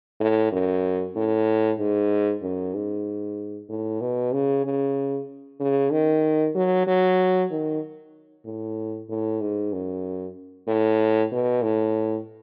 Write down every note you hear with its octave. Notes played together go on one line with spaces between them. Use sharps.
A2
F#2
A2
G#2
F#2
G#2
A2
B2
C#3
C#3
C#3
D#3
F#3
F#3
D#3
A2
A2
G#2
F#2
A2
B2
A2